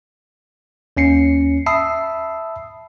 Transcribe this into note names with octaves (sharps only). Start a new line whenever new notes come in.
D#2 C#4 C7 C#7
E5 A5 B5 D#6 E6 C7